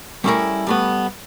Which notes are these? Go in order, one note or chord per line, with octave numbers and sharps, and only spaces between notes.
G3 A3 C#4 E4 G#4 A#4
G3 A3 B3